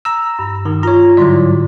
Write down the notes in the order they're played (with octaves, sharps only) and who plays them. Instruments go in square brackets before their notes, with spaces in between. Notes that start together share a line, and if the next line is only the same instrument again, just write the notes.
[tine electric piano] A#5 E6
[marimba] G2
[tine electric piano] D#3
[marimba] F4 [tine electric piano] C#5 A#5
[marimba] G#2 D3 G3 [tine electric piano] F#3 E4 D5